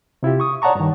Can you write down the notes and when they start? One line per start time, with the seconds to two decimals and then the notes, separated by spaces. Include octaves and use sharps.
0.23 C3 E4 F4 G4
0.40 C#6 D#6
0.62 C#5 D5 F#5 A5 A#5 C#6
0.75 G2 D#3